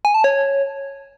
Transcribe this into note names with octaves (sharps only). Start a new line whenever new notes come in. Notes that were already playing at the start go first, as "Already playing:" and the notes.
G#5
A5
C#5